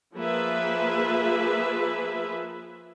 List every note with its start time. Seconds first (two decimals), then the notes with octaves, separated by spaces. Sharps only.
0.16 F3 A#3 F4 G#4 B4 E5